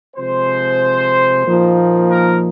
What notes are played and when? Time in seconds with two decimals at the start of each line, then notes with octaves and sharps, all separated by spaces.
0.16 C3 F3 G#3 C5
1.44 A#2 F3 A#3 D#4
2.09 A#4